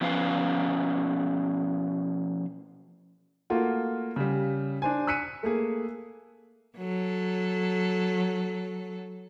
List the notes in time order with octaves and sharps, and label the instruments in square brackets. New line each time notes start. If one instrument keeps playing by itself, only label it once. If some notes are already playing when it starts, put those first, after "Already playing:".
[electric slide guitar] B2 F3 C#4 B4 F5
[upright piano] A3 A#3 F4 F#4
C#3 G3
D4 C5 G#5
E6 F#6 B6 C#7 D#7
A3 A#3 G#4
[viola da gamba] F#3 A4